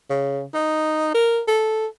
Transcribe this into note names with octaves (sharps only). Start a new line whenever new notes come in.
C#3
D#4
A#4
A4